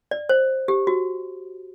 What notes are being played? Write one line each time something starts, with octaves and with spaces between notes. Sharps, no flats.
D5
C5
G4
F#4